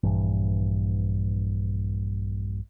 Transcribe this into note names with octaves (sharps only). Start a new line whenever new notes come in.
A#1 G2 E3